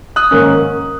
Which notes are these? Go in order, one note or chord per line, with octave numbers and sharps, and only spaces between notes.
D#6 F#6
G#2 D#3 A#3 C#4